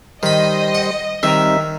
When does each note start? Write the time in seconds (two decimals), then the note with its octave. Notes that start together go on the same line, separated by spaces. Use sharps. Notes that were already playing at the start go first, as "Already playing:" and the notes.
0.23 D#3 G3 C5 D#5 B5
0.75 F#5
1.23 D#3 G3 C4 D#4 A#4 E5